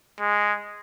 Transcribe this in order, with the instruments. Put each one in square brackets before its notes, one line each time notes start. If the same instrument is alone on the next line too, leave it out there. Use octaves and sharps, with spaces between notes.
[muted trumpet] G#3